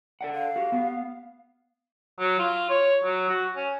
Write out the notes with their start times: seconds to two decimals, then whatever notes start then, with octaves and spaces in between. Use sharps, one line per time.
0.21 A4 D5 F#5
0.34 F5
0.56 F#4 G4
0.72 B3
2.19 F#3
2.39 F4
2.70 C#5
3.04 F#3
3.30 F#4
3.56 C#4